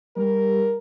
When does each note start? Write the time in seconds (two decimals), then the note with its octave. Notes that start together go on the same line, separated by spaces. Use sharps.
0.16 G3 A#4